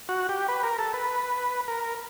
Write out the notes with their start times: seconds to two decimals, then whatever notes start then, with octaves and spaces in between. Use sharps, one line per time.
0.09 F#4
0.29 G4
0.48 B4
0.63 A#4
0.79 A4
0.94 B4
1.68 A#4